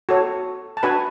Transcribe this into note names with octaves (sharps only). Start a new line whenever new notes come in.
F#4 A4 C#5
A5
D4 F#4 B4 G#5 B5